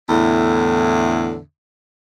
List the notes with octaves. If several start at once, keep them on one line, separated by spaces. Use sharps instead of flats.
E2 A2 D3